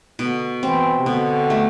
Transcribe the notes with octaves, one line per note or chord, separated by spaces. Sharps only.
B2 D3
E3 C4
C3
B2 D3
A3